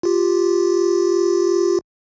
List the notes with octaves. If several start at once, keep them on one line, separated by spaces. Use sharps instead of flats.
F4 G4